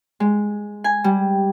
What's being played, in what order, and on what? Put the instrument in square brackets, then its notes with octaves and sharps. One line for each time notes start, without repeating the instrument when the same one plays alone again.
[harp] G#3
G#5
G3